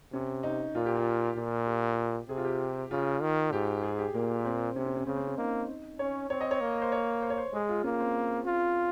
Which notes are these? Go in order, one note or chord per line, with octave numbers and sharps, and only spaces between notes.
C3 C#4
D#4
A#2 F4
G4
F4
A#2 F4
G4
C3 G#4
F4
G4
C#3 F4
D#3
G#2 G4
G#4
G4
A#2 A#3
C4
C3 C#4
C#4
C#4
C#3 C4
C4
C#4
A#3 D#4
C#4 C#5
C4 C#5
D#5
C#5
A#3
C5
C#5
C5
C#5
C5
G#3 G#4
F4
A#3 C#4
C4
F4